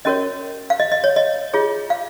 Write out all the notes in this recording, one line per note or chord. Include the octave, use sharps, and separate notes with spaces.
C#4 F#4 A#4 C#5 D#5
F5
D#5
D#5
C#5
D#5
F4 G#4 C#5
F5